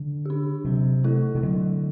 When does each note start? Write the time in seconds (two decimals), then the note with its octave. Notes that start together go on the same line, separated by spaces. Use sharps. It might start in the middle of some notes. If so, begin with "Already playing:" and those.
Already playing: D3
0.25 D4 G4
0.64 C3 F#3
1.04 A3 E4 A4
1.35 C3
1.43 D3 F#3